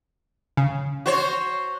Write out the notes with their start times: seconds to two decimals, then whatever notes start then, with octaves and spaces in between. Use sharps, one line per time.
0.57 C#3
1.06 F#4 C5 C#5